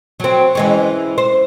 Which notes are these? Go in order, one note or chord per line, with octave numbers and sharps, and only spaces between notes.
F#3 C4
E3 G#3 C#4
C5